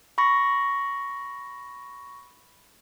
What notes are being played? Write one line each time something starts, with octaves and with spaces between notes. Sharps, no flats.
B5 C#6 A#6